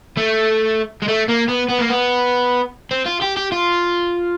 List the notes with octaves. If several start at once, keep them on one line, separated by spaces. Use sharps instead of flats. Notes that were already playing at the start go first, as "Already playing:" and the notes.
A3
G#3
A3
A#3
B3
B3
A#3
B3
C4
F4
G4
G4
F4